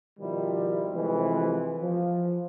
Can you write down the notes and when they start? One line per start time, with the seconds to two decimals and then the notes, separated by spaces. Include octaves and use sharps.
0.20 B2 D#3 F3 G3 D#4 E4
0.94 C3 E3 F3 G#3 A3 C4
1.81 F3